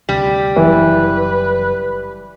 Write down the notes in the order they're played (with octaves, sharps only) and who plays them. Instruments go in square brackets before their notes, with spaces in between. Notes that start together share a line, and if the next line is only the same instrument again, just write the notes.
[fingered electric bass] D2 C3 [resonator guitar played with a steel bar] G3
[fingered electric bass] F#1 F#3 [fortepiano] E3 [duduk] B4